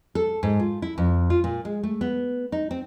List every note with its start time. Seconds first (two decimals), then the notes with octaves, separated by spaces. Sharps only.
0.15 A4
0.43 G#2
0.60 F4
0.82 E4
0.98 F2
1.30 F4
1.44 A#2
1.65 G#3
1.83 A3
2.01 B3
2.52 D#4
2.71 C4